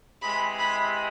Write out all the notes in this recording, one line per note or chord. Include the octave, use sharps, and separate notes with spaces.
C3 E3 G#3 B5
B5